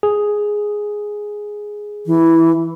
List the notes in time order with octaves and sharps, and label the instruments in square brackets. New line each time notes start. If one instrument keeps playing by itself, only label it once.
[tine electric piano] G#4
[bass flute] E3